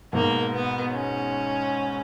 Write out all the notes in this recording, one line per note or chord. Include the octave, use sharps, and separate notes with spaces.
G#2 B2 A#3
B3
C#4